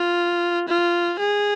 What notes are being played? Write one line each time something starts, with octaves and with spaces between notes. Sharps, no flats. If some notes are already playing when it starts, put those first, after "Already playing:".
Already playing: F4
F4
G#4